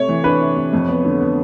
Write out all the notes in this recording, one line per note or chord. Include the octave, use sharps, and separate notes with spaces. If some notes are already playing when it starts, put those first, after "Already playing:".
Already playing: C3 A3 C#5
E3
D4 B4
C3
C3
F2
B3
D3
B3